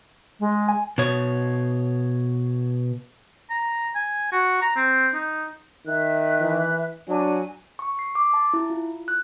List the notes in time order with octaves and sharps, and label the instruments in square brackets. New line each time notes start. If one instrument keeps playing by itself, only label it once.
[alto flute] G#3
[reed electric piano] G#5
[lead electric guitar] B2 C#5
[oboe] A#5
G#5
F#4
A#5
C4
D#4
[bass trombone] D#3 [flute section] E5 F#6
[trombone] E3
[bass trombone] F#3 [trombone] D4 [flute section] G#5
[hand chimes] C#6
C7
D6
A5
E4
F4
F#6